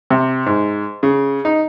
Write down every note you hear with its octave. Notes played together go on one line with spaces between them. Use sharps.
C3
G#2
C#3
D#4